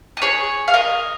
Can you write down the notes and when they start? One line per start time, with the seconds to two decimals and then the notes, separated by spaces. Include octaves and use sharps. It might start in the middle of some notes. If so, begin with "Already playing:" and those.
0.17 D#5
0.22 G#4 C#5
0.68 F5
0.74 A#4 D#5